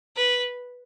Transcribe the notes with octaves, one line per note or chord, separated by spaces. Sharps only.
B4